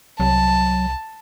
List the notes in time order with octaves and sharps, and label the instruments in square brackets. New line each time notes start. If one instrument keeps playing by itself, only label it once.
[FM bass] C2 [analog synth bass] F#3 [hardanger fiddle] A5